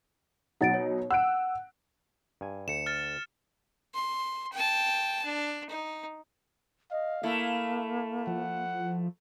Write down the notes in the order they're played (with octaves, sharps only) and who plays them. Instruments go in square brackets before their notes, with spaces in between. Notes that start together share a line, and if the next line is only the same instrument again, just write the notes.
[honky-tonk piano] B2 F#3 D#4 [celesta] F#5 A6 D7
[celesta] C#5
[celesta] F#5 [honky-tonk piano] E6 F#6 D7
[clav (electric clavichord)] G2 G#5
[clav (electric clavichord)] D2 [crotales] C#7 E7
[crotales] F6 A6
[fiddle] C6
G5 A5
D4
D#4
[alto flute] D#5 [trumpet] F5
[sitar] A3 E4 [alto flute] A#3
[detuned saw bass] F3 [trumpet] F#5